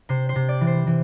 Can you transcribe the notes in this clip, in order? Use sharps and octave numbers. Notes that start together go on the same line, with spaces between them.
C3 C5
C5
C3
D5
E3
C5
E3